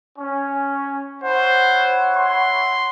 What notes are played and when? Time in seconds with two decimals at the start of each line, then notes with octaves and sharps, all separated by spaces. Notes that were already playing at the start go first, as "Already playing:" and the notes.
0.19 C#4
1.24 E4 C5 C#5 F#5
2.17 C6